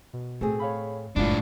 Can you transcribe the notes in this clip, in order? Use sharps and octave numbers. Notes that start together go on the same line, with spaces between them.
B2
A2 A3 C4 G#4
C#5 F5 B5
F#1 F2 A2 G#3 D4 E4 F4 D5